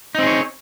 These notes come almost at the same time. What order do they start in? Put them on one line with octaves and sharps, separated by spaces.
D#4 C4 G#4 C#5